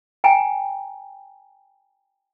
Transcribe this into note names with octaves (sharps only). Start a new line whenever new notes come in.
G5 G#5 A#5